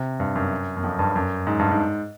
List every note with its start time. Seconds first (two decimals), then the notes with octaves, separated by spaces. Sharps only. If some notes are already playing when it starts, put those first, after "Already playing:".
Already playing: C3
0.20 G2
0.35 F#2
0.77 F#2
0.83 F2
0.99 G2
1.16 F#2
1.47 G#2
1.59 G2
1.71 G#2